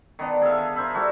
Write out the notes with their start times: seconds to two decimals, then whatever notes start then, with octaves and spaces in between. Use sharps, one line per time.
0.19 D#3 B3 D4
0.41 G#4 A4 E5 F5
0.76 A#4 C5 E5 B5
0.94 G3 E4 F#4 A4